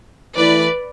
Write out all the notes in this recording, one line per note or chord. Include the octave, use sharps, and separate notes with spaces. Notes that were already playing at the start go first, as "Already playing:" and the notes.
E3 A3 E4 B4 D5